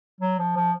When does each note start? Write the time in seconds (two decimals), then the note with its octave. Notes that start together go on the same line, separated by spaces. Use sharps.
0.21 F#3
0.39 F3
0.56 F3